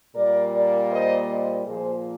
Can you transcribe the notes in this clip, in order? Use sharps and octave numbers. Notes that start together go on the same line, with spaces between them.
A#2 G3 A#3 A#4 D5
A#4 D5
C5 D#5
C5 D#5
A#2 F3 A#3 G#4 C5